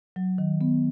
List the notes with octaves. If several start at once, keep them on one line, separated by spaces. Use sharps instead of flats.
F#3
D#3
B3